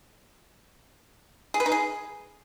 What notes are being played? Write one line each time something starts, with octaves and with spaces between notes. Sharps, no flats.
G#4
B4
D#4
G#4